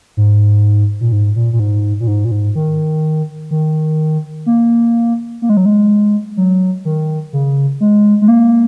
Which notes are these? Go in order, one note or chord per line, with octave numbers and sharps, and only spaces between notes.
G#2
A#2
G#2
A#2
A#2
G#2
A#2
G#2
A#2
G#2
D#3
D#3
A#3
A#3
G#3
F#3
G#3
F#3
D#3
C#3
G#3
G#3
A#3